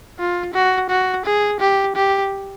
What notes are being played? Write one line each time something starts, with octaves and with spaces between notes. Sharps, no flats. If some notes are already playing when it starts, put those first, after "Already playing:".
F4
F#4
F#4
G#4
G4
G4